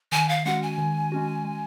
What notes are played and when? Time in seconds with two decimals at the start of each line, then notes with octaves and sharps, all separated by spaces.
0.12 D#3 G#5
0.29 F5
0.45 G#3 C#4 F#4 F#5
0.62 G#5
0.78 D#3
1.12 G#3 C#4 F#4
1.45 G#3